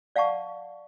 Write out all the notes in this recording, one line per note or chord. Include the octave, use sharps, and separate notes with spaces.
D5 F5 F#5 A5 C#6